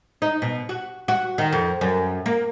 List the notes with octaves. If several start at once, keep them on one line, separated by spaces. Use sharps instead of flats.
D#4
B2
F#4
F#4
D#3
F2
F#2
A#3